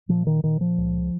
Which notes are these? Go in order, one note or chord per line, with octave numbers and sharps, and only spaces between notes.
A#2 F3
D#3
A#2 D#3
F3
C#2